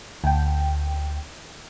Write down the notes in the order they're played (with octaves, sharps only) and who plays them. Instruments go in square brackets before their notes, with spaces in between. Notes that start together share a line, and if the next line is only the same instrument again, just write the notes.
[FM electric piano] D2 G5